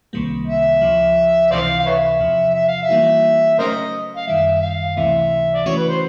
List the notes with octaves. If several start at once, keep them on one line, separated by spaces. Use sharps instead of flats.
C2 C3 D#3 G3 A#3
E5
C#2 C#3 F3
C#2 C3 E3 C5 D5 F5
F5
B4 C#5 E5
E2 C3 F3
E5
F5
E5
E3 G3 A#3 D#4 F#4
C#3 F#3 A3 C#4 A#4 C5 D#5
F5
F#2 D#3 G3 E5
F5
C#2 C3 E3 A3 E5
D5
C#3 E3 A3 C#4 F#4 C#5
B4
C5